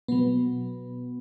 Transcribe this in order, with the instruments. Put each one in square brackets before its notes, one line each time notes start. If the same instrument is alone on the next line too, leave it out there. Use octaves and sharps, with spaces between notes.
[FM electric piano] B2 F#3 B3